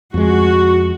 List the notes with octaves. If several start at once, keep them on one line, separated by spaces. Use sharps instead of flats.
F2 G#3 F#4